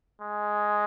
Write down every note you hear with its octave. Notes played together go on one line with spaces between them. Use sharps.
G#3